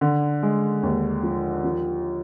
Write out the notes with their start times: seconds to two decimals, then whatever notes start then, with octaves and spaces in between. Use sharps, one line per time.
0.01 D3
0.43 G#3
0.83 D#2
1.23 F3
1.64 F3